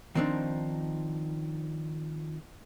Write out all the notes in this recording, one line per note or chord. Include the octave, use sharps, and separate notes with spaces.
D#3 F3 C4 D4 D#4